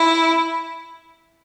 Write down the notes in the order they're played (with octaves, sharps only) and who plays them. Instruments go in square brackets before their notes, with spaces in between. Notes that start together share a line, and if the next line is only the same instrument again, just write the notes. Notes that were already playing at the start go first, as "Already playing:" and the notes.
Already playing: [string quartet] E4